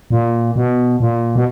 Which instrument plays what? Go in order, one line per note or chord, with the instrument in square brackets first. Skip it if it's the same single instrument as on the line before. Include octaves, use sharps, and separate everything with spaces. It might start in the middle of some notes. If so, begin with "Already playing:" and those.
[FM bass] A#2
B2
A#2
B2